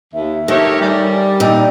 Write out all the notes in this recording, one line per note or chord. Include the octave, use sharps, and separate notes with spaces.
D#2 E5
D#3 A3 G4 A#4 C#5
G3 G#5
D5
A#2 C4 D#4